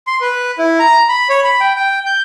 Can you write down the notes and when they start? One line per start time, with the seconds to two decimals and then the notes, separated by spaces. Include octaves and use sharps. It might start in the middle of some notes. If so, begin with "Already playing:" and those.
0.07 C6
0.21 B4
0.59 E4
0.79 A#5
1.09 B5
1.29 C#5
1.44 B5
1.61 G5
1.76 G5
2.06 G6